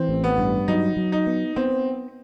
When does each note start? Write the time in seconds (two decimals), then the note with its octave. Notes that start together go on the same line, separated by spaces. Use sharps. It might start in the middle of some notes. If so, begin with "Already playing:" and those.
Already playing: E3 C4
0.09 A1
0.24 B3
0.38 G2
0.68 F#3 D#4
0.97 F#3
1.12 D#4
1.27 B3
1.56 B3 C4